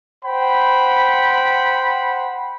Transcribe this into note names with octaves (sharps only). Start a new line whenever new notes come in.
C5 F#5 G5 B5